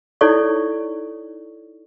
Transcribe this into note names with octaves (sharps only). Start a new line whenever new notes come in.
D#4 E4 A4 C#5 D5 C#6